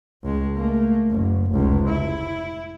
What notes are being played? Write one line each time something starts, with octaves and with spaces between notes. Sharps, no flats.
C#2 G#3
A3 A#3
F#1
F1 C#2
E4